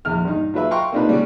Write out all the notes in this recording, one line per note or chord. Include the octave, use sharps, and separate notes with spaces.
A#1 E2 F6
G2 D#4
F#3 F4 B4 E5
F5 G5 A#5 C6 C#6
A#3 C4 D4 D#4 F4 B4
G3 C#4 D5